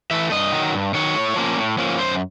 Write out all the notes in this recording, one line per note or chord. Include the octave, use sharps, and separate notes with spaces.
E3 A3 E5
G2 D#5
D#3 F#3
G2
D#3 F#3 C#5
A2
F3 A#3 C#4
A2
F3 A#3 C#4
F#2 C5